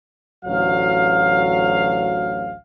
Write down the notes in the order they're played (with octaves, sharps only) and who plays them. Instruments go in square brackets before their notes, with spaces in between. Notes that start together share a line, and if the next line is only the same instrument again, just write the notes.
[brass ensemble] A1 D2 F#3 F5